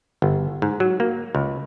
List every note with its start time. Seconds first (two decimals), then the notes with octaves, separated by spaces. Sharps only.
0.22 G1
0.62 G#2
0.80 F#3
1.00 A#3
1.35 C#2